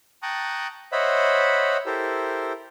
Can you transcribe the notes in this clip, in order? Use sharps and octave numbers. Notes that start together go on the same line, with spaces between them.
G5 A5 A#5 C#6 D#6 F#6
C5 C#5 D#5 E5 F#5 B5
E4 G4 A4 A#4 C5